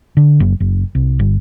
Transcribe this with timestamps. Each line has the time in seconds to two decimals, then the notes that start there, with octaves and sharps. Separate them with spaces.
0.17 D3
0.40 F#1
0.60 F#1
0.95 C2
1.19 G1